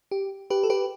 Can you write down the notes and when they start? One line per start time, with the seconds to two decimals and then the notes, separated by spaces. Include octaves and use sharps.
0.11 G4
0.50 G4 B4
0.63 A4
0.70 G4 B4